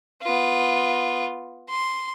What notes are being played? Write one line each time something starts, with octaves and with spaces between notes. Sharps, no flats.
B3 F4
C6